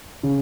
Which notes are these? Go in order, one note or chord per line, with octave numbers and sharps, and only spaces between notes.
C#3